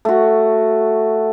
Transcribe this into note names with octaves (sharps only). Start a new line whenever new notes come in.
A3 F#4